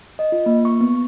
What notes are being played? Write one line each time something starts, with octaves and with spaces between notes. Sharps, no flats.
D#5
F4
A#3
C#6
B3